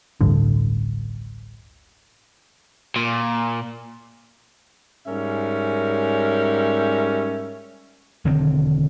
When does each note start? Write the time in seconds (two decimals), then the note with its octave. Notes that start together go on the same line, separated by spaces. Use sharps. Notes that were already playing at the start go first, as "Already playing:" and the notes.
0.21 D1 A1 G2 D3
2.96 A#2
5.06 G#2 G3 C#4 A#4 E5
8.25 E1 D3 D#3 C4